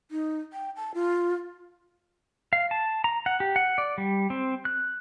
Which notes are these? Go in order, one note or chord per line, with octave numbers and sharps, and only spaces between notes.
D#4
G5
A5
F4
F5
A5
A#5
F#5
G4
F#5
D5
G3
C4
F#6